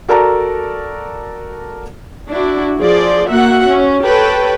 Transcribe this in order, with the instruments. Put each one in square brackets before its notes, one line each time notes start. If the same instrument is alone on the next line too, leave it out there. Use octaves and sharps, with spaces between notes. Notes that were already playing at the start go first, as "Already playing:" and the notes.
[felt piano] F#4 A4 A#4 D5 A5 A#5
[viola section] D4 E4 F#4
F3 G#4 D5 C6
A#3 F#4 E5 F#5
C#4
G4 A4 B4 C#5 G5 A5